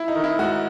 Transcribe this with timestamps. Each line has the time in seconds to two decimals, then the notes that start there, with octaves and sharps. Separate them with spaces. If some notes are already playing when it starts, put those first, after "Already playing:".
Already playing: E4
0.08 D#4
0.16 D#3
0.24 E4
0.39 G#2 F#4